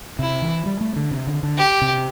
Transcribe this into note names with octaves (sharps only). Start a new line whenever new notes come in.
C3 E4
E3
G3
A3
D3
C3
D3
D3
G4
C3